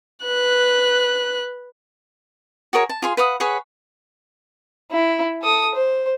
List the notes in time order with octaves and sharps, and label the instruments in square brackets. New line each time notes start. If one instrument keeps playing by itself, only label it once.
[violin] B4 F#6
[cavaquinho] F#4 G#4 A#4 C#5
A5
F4 G#4 C6
B4 F5 F#5 D#6
G#4 B4 C#5 F#5
[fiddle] E4
A4 D#6
C5